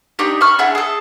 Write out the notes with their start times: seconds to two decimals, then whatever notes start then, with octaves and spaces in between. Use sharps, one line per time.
0.19 D4 D#4 G4
0.41 B5 C#6 F6
0.59 D4 E4 G#4 F#5
0.75 G#4 A4